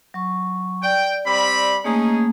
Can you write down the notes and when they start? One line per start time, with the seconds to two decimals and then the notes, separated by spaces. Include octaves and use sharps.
0.14 F#3 C#6
0.83 D5 G5
1.26 G3 C4 B5
1.84 A3 A#3 C#4 D#4 G#4